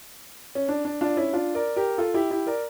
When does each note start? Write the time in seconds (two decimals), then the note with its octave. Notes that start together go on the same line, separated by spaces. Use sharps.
0.55 C#4
0.69 D4
0.85 D4
1.01 D4 F4
1.17 C#4 E4
1.33 D4 F4
1.55 A#4 D5
1.76 G4 A#4
1.98 F4 A4
2.14 E4 G4
2.31 E4 G4
2.47 A#4 D5